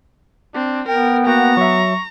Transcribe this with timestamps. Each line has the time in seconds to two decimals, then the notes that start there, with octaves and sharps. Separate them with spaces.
0.54 C4 D4
0.88 B3 A#4 G5
1.27 A#3 F#4 G5 A#5
1.57 F#3 E5 C#6